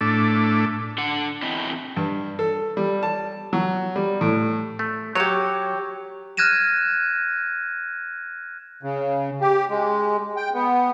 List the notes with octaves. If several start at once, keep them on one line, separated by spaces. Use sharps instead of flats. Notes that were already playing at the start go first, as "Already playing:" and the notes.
A2 A3 D4
D3 D4 F#5
E2 C4 E4 D#5 E5
G2
A4
G3
A5
F#3
G3
A2
A3
F#3 G4 C#5
F6 F#6 G#6 A#6 D#7 E7
C#3
G4
G#3
G5
B3